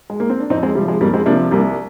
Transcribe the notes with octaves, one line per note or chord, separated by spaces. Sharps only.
G#3
A#3
C4
D4
F2 C4 D#4
G#3 C4
C3 F3 G3
G#3
F2 G3 A#3
G#3 C4
C3 F3 A#3 D4
C2 G3 A#3